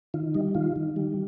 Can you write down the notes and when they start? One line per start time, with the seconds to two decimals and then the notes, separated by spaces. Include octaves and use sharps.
0.14 D#3 F4
0.34 G3 D#4
0.55 D#3 F4
0.76 D#3
0.96 G3